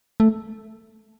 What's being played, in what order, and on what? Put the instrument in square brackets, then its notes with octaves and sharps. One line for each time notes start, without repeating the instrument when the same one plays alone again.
[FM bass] A3